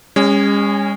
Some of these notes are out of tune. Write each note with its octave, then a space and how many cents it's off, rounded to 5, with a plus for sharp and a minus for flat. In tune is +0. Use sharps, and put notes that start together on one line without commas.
G#3 -40 C#4 +0